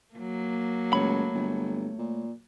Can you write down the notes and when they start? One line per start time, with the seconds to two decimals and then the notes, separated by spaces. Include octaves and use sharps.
0.14 F#3 A#3
0.93 C#2 A3 C#5 B5
1.34 G1
1.98 A#2